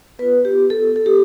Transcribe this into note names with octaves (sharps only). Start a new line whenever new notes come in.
B3 F4 B4
G4
A4
A4
G4